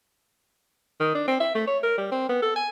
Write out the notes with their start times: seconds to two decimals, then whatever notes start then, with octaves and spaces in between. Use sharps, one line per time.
1.00 D#3
1.15 D4
1.28 C4
1.40 E5
1.55 A3
1.67 C#5
1.83 A#4
1.98 G3
2.12 C4
2.29 B3
2.43 A4
2.56 G#5